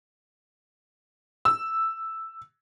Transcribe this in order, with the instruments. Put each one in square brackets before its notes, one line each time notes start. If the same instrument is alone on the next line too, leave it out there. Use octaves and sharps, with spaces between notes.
[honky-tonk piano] E6